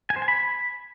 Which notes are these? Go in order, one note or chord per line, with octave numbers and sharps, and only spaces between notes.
G#5
C5
G#5
B5